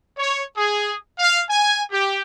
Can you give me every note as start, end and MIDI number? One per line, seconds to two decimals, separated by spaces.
0.18 0.42 73
0.57 0.94 68
1.19 1.40 77
1.50 1.80 80
1.92 2.22 67